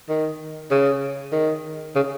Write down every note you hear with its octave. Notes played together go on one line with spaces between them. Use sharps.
D#3
C#3
D#3
C#3